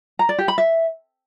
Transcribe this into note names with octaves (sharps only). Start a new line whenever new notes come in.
A#5
D5
G4
B5
E5